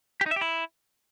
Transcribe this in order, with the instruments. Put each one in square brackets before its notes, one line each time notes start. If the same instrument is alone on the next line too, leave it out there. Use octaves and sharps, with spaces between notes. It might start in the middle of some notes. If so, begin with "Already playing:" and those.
[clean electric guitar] G4
D#4
E5
G4
E4